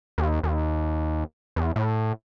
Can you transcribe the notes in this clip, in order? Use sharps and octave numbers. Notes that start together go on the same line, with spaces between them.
D#2
D#2
E2
A2